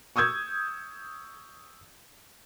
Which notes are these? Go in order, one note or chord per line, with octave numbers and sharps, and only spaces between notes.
C#6 D#6 E6 G6 G#6